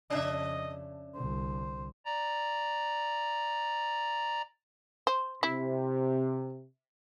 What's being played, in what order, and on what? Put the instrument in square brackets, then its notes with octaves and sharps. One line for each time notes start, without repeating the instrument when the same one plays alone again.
[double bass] F2 C#3 [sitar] C#4 D4 E5 [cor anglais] D#5
[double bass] C2 D3 [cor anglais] C5
[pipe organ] D5 A#5
[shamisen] C5
[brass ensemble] C3 [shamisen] E4